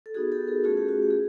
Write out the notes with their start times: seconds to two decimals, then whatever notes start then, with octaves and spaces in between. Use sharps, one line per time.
0.06 A4
0.14 B3 D#4 F#4 G#4
0.32 G4 A4
0.47 G#4 A#4
0.64 A3 C#4 F4 F#4 G#4
0.77 G4
0.89 F#4
1.02 G4
1.11 G#4